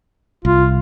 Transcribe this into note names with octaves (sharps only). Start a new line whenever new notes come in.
C2 F4